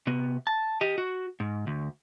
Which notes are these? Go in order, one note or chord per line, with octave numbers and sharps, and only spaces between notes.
C3 B3
A5
G4 D#5
F#4
G#2
D2